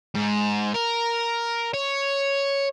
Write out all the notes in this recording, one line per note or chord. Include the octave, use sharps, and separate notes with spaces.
G#2
A#4
C#5